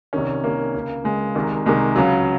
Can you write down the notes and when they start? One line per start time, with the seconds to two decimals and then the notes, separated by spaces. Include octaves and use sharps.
0.13 C2 C3 D#3 C#4
0.44 C2 C3 D#3 A#3
0.74 C#2 C#3
1.04 C#2 C#3 G#3
1.35 C2 C3 D#3
1.66 C2 C3 D#3 G#3
1.96 C#2 C#3 F#3